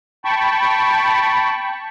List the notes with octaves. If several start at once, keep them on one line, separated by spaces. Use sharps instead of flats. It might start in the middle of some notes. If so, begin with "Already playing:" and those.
G5 A5 B5 C#6